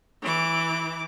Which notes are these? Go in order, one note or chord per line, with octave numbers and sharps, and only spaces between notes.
E3 D6